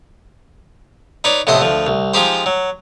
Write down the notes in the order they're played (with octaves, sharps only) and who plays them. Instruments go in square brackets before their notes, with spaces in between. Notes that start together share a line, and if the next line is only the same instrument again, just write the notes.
[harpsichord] D#4 B4 C#5 D5
F2 A2 C3 B3 C5 D#5
D2 F3
C2
F3 G#3 D#4 G4 C5
F#3